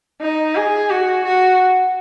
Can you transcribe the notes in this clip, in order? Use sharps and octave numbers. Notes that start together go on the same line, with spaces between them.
D#4
G#4
F#4
F#4